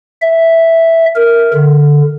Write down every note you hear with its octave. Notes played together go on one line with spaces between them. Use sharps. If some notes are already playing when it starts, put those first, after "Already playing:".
E5
A#4
D3